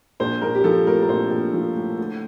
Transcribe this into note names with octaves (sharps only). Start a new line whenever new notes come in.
A#1 C5
A#1 A#4
G4
F3 A4
A2 A#4
A#4
A#1 C5
A#1
F3
A2
D2